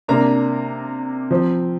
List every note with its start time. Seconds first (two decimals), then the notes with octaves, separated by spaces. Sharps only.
0.08 C3 A#3 D4 A#5
1.31 F3 C4